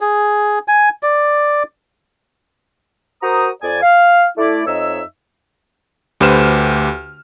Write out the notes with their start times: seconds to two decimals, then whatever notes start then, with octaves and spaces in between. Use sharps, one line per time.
0.01 G#4
0.68 G#5
1.03 D5
3.22 F#4 A#4 C5 A#5 D#6
3.61 F2 D5 G#5
3.82 F5
4.37 A3 E4 D5
4.66 F2 D#4 C#5 D#5 E5 E6
6.21 D2 G4 B4 C5 F6 E7